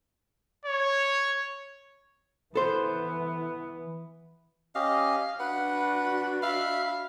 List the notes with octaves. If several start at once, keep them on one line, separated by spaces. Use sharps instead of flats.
C#5
E3 B3 A4 C5
C#4 G4 D#5 F5
D4 F#4 B4 F#5
E5 F5 B5